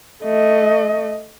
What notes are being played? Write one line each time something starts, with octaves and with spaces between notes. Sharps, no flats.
A3 D#5